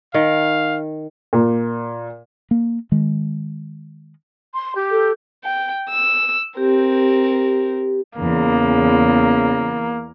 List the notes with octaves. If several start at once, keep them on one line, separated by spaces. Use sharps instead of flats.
D#3 F5
A#2
A#3
D#3 G#3
C6
G4
A4
G5
E6
C4 G4 A#4
E2 C#3 A#3